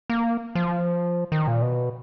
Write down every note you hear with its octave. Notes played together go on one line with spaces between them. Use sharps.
A#3
F3
D#3
A#2
B2